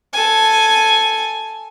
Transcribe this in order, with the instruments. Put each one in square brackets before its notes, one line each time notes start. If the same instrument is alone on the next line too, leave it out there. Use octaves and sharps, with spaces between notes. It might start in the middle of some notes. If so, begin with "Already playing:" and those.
[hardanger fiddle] A4 G#5